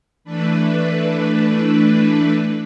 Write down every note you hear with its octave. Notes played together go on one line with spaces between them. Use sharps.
E3 A3 D4 B4